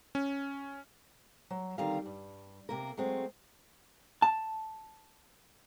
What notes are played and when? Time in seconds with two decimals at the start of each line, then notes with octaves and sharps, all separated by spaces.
0.15 C#4
1.50 F#3
1.78 D3 D#3 G3 C4 A#4 F5
2.06 G2
2.69 C3 A#3 A#4
2.97 F#3 G#3 A3 C4
4.22 A5